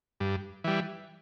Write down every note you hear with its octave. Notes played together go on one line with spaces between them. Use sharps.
G2
E3 G3